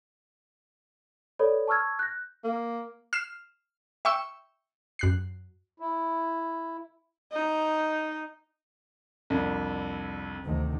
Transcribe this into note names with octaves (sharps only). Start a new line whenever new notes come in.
A4 B4 C#5 D5 B5
A5 C#6 E6 F6 G#6
F#6 G6 A#6
A#3
F6 C7 E7
E5 G5 C#6 E6
F#2 F#6 C7
E4
D#4
C2 F2 D4
D2 C3 D#3